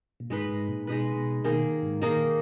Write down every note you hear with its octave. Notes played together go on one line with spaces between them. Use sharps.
A#2
G#2 G#3 D#4 G#4 B4
G#2
A#2
B2 G#3 D#4 G#4 B4
B2
B2 D#3 A#3 D#4 G#4
G#2
A#2 D#3 A#3 D#4 G#4